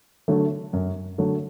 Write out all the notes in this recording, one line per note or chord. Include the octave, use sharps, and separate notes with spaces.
D3 F#3 A3
F#2
D3 F#3 A3